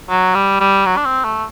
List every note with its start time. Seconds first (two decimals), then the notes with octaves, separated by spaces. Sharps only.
0.10 F#3
0.35 G3
0.61 G3
0.86 F#3
0.97 D4
1.05 C4
1.25 A3